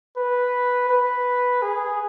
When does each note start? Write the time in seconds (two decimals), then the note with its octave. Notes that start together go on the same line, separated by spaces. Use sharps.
0.17 B4
0.89 B4
1.62 G#4